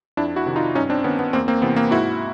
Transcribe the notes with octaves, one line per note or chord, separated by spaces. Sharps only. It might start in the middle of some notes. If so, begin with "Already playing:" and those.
F2 D4 E4
E4 F#4
C3 D#3
D#4 F4
G2 C#4 D#4
C4 D4
D#3 B3 C#4
B3
E2 A#3 C4
A#3 C4
C3 E3 B3
A#3 C4
G#2 E4 F#4